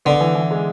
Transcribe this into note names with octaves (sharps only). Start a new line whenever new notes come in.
D3 B3
E3
E3
G#3